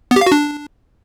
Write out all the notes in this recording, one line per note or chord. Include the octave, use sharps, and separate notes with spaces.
B3
G4
F5
F#4
D4